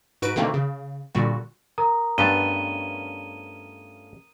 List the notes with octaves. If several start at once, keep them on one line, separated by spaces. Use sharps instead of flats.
G#2 F#4 B4 D7
B2 D3 D#3 A3 A#3 C4
C#3
A#2 D3 G3 F#4
A#4 A#5 D#6
G2 A3 B3 C#4 F4 A5 D#7 G7